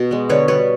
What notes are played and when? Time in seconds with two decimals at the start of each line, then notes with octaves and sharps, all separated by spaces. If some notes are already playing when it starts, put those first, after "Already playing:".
Already playing: B2
0.11 G#3 B3
0.29 D3 B4 C#5
0.48 G3 B3 B4 C#5